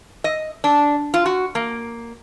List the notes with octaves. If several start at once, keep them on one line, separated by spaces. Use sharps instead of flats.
D#5
D4
F4
F#4
A#3